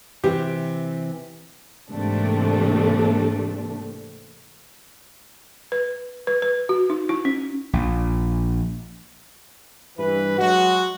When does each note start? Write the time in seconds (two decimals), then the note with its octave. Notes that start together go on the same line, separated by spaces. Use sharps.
0.24 C3 E3 G4
1.92 G#2 C3 E3 A3 A#3 D4
5.72 B4
6.27 B4
6.42 B4
6.69 F#4
6.90 D#4
7.09 E4
7.25 C#4
7.73 A#1
9.98 G2 E3 B4
10.38 F#3 G#3 F#4